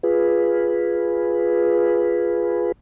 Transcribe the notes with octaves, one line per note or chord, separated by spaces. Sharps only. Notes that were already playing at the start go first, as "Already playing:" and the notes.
F4 G#4 B4